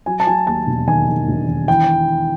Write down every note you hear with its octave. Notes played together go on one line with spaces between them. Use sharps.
F#3 G#5
A5
F#3 G#5
D#2 A5
E1
D#3 G#5
D#3
E1
D#3
E3 G5